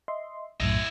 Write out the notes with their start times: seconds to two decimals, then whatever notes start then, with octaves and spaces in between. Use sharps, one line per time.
0.08 D#5 E5 C6
0.60 B1 F#2 A2 E4 D#5